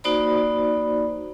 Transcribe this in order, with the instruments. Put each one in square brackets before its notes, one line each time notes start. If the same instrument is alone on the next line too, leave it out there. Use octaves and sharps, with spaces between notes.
[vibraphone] A#3 D#4 F#4 C5 D5 B5